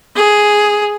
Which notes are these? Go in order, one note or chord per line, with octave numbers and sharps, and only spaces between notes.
G#4